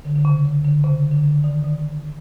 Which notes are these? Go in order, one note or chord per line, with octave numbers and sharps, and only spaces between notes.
D3
D3
C#3
D3
D3
C#3
D3
D3
D3
D#3
D#3